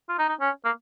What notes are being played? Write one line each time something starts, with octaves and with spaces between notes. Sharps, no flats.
F4
D#4
D#4
C#4
A#3